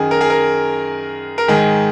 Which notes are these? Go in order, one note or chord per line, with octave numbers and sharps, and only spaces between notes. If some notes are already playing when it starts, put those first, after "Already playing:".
Already playing: F#2 D#3 G#4
A#4
G#4
A#4
A#4
G#2 D#3 G#4